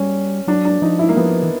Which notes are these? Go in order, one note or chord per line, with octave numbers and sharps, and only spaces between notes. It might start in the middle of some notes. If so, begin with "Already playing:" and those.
Already playing: G3 C#4
F#3 D4
D4
F3 D#4
E4
A#3
F3 B3
E3